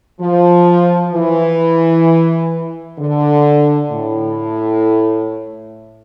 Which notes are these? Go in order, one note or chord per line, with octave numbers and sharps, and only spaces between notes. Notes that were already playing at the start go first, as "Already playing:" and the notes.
F3
E3
D3
A2